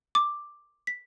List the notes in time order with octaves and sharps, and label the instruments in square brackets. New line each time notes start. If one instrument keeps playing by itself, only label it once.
[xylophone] D6
B6